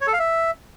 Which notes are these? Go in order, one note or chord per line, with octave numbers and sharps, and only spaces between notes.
C#5
A4
F5
E5